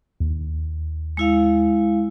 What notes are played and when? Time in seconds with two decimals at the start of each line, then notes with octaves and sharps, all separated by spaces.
0.20 D#2
1.17 G#3 E4 F5